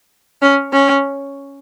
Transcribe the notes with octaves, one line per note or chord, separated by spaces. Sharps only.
C#4
C#4